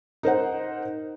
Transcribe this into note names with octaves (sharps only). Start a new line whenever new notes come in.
D#4 A#4 C5 F#5